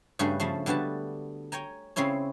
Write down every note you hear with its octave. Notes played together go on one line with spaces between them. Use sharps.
G2 C#3 G3 A3 C#4 F#4
C#3 F3 A3
D3 G3 B3 F#4 A5
C#5 G5 G#5 A#5
C#3 C4 C#4 E4 C#5